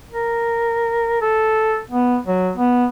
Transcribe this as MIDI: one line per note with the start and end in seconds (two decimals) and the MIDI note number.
0.12 1.18 70
1.22 1.78 69
1.90 2.18 59
2.27 2.52 54
2.57 2.86 59